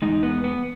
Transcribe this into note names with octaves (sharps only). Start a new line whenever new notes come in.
E2 C#3 G#3 D#4
B3
B3